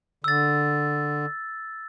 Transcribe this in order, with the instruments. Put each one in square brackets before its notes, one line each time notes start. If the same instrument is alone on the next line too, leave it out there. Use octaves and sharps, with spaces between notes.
[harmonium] D3 [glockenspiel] E6 A6